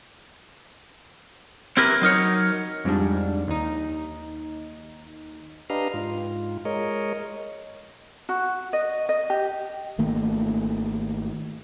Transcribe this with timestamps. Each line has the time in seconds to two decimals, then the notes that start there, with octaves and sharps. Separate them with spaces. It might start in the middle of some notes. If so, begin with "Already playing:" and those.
1.77 C4 E4 G4 A#4 B4
2.02 F#3 D#4 A#4 C#5
2.84 F2 G#2 G3 D4
3.48 D#2 D#4
5.70 D4 G4 B4 D#5 F5 A#5
5.94 G#2 F4
6.65 G#3 A#4 C#5 D#5
8.29 F#4
8.73 D#5
9.09 D#5
9.30 G4
9.98 G#1 D#3 A3 A#3